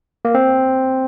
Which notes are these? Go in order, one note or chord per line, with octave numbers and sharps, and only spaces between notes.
A#3
C4